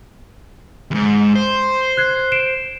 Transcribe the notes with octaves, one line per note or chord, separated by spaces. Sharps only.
E2 G#2
C5
F#6 G#6 C7
C7 D7 E7